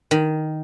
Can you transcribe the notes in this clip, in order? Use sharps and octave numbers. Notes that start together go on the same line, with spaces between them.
D#3